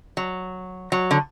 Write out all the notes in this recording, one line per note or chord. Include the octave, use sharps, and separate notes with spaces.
F#3
F#3
D3